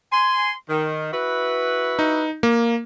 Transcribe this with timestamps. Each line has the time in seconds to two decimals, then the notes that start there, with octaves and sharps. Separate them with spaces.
0.11 G#5 C6
0.69 D#3
1.12 E4 F#4 B4
1.99 D#4
2.43 A#3